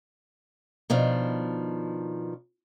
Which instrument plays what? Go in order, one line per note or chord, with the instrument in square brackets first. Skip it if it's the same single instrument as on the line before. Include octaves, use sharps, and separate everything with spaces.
[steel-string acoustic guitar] B2 D#3 F3 D4